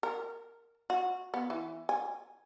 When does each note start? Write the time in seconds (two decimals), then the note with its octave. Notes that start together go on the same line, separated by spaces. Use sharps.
0.03 A#4
0.90 F#4
1.34 B3
1.50 E3
1.89 G#5